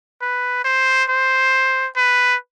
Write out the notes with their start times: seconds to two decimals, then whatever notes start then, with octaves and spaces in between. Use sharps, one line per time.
0.22 B4
0.65 C5
1.09 C5
1.96 B4